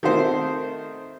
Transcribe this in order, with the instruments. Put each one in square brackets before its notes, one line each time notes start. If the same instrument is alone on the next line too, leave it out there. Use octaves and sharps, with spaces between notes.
[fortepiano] D#3 A3 C4 C5